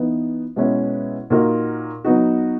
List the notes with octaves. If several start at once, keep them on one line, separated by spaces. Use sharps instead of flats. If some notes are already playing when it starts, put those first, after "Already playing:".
Already playing: E3 B3 D#4
B2 G#3 C#4 E4 B4
A#2 A#3 D#4 F#4 A#4
F#3 B3 D#4 F#4